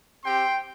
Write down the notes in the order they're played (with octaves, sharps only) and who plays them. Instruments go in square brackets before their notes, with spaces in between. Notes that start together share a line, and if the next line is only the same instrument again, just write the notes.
[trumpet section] C4 G4 G5 C6